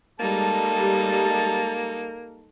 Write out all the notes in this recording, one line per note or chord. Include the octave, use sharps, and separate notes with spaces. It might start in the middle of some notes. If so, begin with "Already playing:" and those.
G3 G#3 A#3 D#4 G4 A4 A5